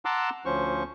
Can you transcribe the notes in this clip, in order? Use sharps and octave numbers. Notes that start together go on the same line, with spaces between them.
F#5 A5 A#5 C6 D6 E6
D2 F3 C#4 C5 C#6